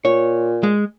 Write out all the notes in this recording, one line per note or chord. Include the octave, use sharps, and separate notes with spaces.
A#2 C#5
G#3